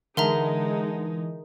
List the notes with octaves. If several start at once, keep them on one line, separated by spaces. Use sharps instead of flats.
D3 E3 G#3 D#4 A#4 E5 A#5